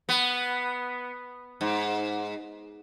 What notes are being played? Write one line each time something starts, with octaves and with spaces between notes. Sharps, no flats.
B3
G#2